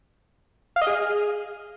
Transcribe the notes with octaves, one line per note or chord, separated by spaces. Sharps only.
F5
D#5
G#4